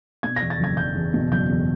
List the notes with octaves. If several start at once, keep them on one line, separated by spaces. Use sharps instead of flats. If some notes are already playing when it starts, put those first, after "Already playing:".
B2 G#6
A#6
E2
A6
F#1 G#6
F#1 G6
E2
B2
F#1 G6
E2